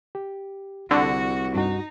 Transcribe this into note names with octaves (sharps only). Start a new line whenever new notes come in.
G4
C2 D3 F#4 C#6
G2 D#4 F#4